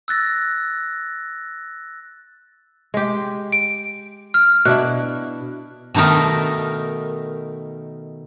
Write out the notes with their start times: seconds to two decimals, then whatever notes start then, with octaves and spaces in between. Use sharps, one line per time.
0.08 E6 F#6 A6 A#6
2.94 G#3 G4
3.52 D7
4.34 F6
4.65 B2 D4 E4 F#6
5.94 B2 D#3 A3 D#4 A#4